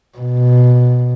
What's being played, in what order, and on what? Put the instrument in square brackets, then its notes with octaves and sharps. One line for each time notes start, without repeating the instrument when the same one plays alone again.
[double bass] B2